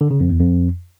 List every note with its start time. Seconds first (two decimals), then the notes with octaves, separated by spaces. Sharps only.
0.01 D3
0.11 C#3
0.20 F2
0.30 E2
0.40 F2